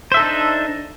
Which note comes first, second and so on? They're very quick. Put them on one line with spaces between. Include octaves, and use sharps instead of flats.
C5 E5 A4 D#4 D4